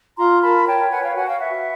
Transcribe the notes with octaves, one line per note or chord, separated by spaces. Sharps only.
F4 A#5 C6
A#4 A5 B5
C#5 G5 A5
B4 F#5 G#5
F5 G5
F#4 F#5 G#5
F5 G5
B4 E5 F#5